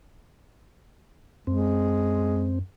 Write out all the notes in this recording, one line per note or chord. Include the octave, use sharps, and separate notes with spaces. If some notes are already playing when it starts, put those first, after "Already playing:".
F#2 G#3 C4